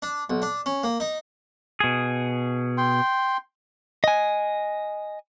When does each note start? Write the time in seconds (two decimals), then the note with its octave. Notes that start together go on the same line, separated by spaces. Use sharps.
0.02 D4
0.30 B1
0.42 D4
0.66 C#4
0.83 A#3
1.00 D#4
1.80 B2 G#4
2.78 G5 C6
4.04 D#5 G#5